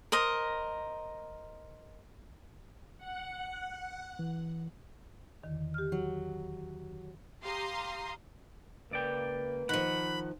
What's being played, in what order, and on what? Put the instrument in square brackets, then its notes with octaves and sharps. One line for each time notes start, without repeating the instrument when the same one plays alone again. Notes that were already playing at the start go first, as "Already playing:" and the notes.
[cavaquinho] A#4 C5 D#5
[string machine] F#5
[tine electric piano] E3
[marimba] E2 D3 D#3
G4 F6
[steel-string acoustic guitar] F#3
[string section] G4 F5 A#5 C6 D#6
[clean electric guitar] C#2 D5 G5 [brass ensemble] A#3 B4
[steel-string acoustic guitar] D#3 F3 [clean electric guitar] F#5 [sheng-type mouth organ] B5